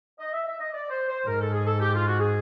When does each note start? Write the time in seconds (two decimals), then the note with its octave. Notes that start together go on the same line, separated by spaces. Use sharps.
0.19 D#5
0.33 E5
0.46 E5
0.59 D#5
0.73 D5
0.90 C5
1.08 C5
1.26 G#2 A#4
1.40 A4
1.53 G#4
1.66 A4
1.80 G4
1.93 F4
2.07 F#4
2.20 G#4